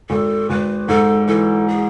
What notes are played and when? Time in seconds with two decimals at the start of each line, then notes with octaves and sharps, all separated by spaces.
0.09 G#1 A4
0.50 G#1 B4
0.88 G#2 A4
1.27 E3 A4
1.68 G#4